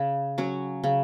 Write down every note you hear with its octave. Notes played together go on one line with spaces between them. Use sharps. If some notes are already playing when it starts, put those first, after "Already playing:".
Already playing: C#3
F#3 C#4
C#3